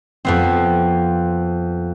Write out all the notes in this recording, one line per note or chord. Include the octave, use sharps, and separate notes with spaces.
F2 B3 C4